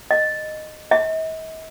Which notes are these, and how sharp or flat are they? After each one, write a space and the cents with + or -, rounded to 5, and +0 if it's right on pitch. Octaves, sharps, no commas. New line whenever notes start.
D#5 -10
D#5 +45